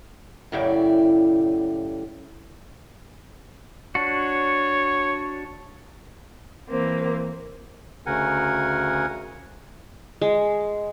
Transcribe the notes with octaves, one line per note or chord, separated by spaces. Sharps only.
F#2 A2 C#3 E4 G4 D5
D4 F#4 C#5
E3 A#3 C4
D2 C#3 A#4 F#5 G#5
G#3